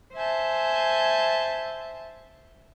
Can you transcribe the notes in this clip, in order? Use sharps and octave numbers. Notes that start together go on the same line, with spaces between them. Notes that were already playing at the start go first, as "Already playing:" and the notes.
C5 E5 G#5 A5 G6